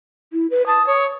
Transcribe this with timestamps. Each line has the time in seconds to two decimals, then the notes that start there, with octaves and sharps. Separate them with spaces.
0.33 E4
0.51 B4
0.67 A5 D#6
0.87 C#5